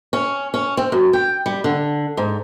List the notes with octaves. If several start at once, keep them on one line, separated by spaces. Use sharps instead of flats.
C#4
C#4
C4
F#2
G5
G3
D3
G#2